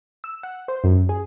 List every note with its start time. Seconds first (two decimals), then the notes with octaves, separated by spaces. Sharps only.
0.24 E6
0.43 F#5
0.68 C5
0.84 F#2
1.09 G#4